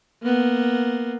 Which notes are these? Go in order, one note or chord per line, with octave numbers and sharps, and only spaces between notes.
A#3 B3